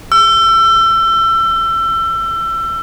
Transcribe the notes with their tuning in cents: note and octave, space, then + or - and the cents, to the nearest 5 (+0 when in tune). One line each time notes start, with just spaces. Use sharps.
E6 +30